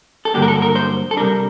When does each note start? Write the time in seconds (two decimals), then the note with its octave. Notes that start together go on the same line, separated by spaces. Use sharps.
0.25 A4
0.34 G2 D3 F#3 A#3 D4 G4
0.42 A#4
0.48 A4
0.62 A#4
0.75 C5
1.11 A4
1.17 C3 G3 D4 A#4